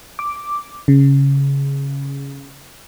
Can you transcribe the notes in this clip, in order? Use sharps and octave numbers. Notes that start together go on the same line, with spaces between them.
D6
C#3